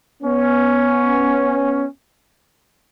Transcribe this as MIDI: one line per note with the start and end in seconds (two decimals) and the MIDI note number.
0.23 1.86 59
0.23 1.86 61